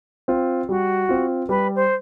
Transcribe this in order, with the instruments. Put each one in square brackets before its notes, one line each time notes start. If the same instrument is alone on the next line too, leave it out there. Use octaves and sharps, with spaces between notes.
[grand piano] C4 F4
[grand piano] G3 [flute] F#4
[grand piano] C4 F4
[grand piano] G3 [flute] B4
[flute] C5